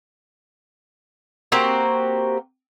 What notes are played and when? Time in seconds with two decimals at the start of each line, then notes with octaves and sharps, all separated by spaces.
1.52 A#3 C4 F#4 G4